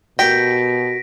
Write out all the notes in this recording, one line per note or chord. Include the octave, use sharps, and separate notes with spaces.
B2 F#4 G4 A#4 G5 A#6 B6 D7